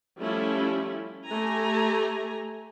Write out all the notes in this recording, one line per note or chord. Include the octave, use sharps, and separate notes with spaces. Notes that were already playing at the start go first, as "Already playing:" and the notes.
F3 G3 A3 C#4 E4
A3 G4 G#5 A#5